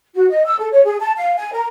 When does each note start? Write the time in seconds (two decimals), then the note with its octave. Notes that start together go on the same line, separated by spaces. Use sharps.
0.15 F#4
0.29 D#5
0.45 E6
0.59 A4
0.72 C#5
0.85 G#4
1.00 A5
1.17 F5
1.37 G#5
1.52 A#4